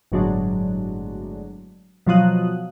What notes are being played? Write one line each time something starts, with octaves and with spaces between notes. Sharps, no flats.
G1 A2 F#3 G#3 D4
B2 F3 F#3 F4 D#6 F#6